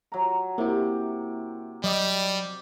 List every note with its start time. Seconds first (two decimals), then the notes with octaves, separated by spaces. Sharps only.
0.12 F#3 A#5
0.58 C3 A#3 E4 G4
1.84 F#3 G3 D5 D#5 D6